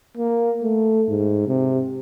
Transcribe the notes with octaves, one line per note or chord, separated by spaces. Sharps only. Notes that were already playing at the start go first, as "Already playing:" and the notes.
A#3
A3
G#2
C3